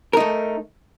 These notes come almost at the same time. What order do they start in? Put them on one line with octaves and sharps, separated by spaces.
A#4 D#4 A3